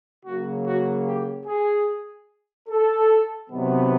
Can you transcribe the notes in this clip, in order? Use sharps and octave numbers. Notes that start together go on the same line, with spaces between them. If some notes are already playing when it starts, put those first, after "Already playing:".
C#3 F#3 A#3 F#4
F#4
G4
G#4
A4
C3 D#3 F#3 B3